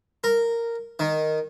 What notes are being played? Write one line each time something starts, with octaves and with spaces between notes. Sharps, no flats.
A#4
D#3